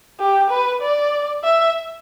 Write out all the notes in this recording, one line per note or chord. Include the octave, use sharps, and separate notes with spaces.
G4
B4
D5
E5